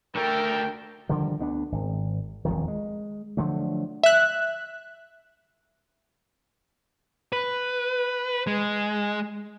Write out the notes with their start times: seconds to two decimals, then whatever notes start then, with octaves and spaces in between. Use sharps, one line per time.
0.16 D2 A4 A#4 G5
1.09 D3 D#3 F3 G3
1.39 D2 B3 D4
1.72 G#1
2.45 D#1 B1 F2 D#3
2.68 G#3
3.37 D3 F3 F#3 A3
4.03 E5 F#6
7.33 B4
8.47 G#3